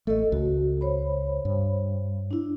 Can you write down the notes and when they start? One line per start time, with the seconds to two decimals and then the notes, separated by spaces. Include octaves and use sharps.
0.07 A1 A3 A4 D#5
0.32 C#2 F#4
0.81 C5 C#5 B5
1.45 G2
2.31 D4 E4